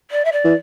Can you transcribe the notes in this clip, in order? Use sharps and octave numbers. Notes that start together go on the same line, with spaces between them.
D5
E5
D5
E3